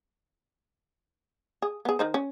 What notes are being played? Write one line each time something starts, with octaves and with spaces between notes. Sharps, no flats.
G#4
B3 G#4
D#3 D#4 C5
C#4